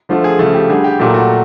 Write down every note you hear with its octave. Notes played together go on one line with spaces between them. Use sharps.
D3 F3 A3
G#4
C#3 F3 A3
G4
D3 G3 G#4
G4
A#2 F#3 A3 G4
F#4